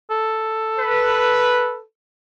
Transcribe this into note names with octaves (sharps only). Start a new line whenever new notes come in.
A4
B4